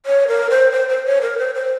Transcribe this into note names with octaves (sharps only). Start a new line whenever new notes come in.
C#5
A#4
C5
C5
C5
C#5
A#4
C5
C5